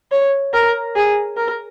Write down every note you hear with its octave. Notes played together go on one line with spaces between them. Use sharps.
C#5
A#4
G#4
A#4